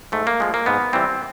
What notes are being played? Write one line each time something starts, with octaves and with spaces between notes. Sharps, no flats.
G#2 A3
A#3
F3 G#3
A#3
G#2 B3
E3 G3 C4